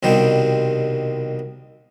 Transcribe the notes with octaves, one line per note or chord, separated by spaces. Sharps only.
C2 B2 D#3 G3 C4 G5